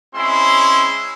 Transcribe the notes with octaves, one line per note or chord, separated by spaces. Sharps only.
G#3 C4 C#4 E4 C6